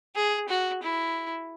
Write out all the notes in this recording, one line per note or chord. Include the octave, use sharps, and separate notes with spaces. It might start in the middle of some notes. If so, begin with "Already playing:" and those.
G#4
F#4
E4